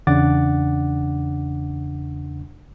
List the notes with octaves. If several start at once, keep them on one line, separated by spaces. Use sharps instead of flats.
E2 C#3 D4 F#5 D6 A6